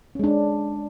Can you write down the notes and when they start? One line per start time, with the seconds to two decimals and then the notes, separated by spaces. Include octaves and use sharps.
0.15 C#4
0.19 G#3
0.24 D4